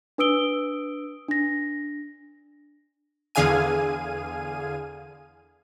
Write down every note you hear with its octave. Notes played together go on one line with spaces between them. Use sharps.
D4 B4 D#6 E6 D7 G7
D4 A#6
E2 D3 G#4 F5 G#5 D#7